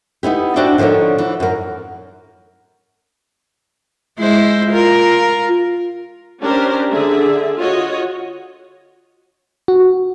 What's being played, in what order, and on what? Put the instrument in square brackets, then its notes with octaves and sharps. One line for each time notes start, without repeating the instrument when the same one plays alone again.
[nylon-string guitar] B3 D#4 E4 G4
D4 F#4 C5 D5 E5 G5
D3 F3 D#4 A#4 C#5
E3
F#2 A#4
[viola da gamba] G#3 E4 C5
F4 A#4
[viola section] C#4 D4 G4 A#4 C5
D3 G#4 E5
F4 F#4 C#5 D#5
[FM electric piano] F#4